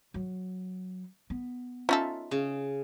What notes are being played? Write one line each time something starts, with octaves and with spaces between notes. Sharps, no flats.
F#3
B3
C#4 D#4 F4 A4 E5
C#3